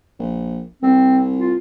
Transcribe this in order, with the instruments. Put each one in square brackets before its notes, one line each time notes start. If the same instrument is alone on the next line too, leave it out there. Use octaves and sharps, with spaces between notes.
[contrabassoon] A#1
[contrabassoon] C2 [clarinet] C4
[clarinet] F4